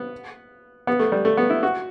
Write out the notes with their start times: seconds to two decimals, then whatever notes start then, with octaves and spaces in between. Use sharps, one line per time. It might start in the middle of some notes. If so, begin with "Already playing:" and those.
Already playing: B3
0.87 B3
0.99 A3
1.12 G3
1.25 A3
1.37 B3
1.50 E4
1.63 F#4